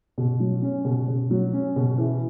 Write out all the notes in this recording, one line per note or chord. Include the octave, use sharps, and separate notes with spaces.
B2
F#3
C#4
B2
B2
F#3
C#4
B2
E3